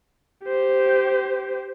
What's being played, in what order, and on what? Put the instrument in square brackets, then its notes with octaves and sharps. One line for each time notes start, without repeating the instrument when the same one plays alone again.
[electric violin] G4 C5